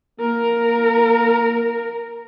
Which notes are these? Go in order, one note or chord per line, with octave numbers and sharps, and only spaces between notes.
A#3 A#4